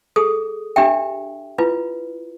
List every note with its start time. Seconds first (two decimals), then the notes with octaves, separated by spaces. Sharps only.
0.16 G#4 A4 D#6
0.76 D4 G4 E5 G5
1.58 E4 F4 B4